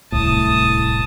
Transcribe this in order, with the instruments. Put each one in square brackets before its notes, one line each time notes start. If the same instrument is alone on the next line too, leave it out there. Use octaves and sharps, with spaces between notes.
[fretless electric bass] D1 C2 A2 [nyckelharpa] A5 D#6